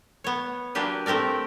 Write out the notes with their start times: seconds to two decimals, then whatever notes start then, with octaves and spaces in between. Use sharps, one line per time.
0.24 B3 C#5
0.75 F#3 A#3 D4 G4 B4
1.06 A3 C4 G4 A#4 D5